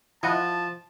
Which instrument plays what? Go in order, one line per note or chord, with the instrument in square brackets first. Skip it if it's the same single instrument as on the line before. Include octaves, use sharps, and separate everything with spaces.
[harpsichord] F3 [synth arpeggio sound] E4 D#5 F#5 [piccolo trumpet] A5